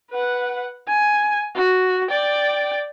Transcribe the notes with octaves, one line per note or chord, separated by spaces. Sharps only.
B4 F#5
G#5
F#4
D5 G5